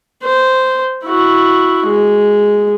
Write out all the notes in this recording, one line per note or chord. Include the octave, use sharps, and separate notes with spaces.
C5
E4 F#4
G#3